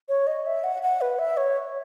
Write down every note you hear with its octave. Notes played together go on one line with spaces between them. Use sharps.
C#5
D#5
E5
F#5
F#5
B4
E5
C#5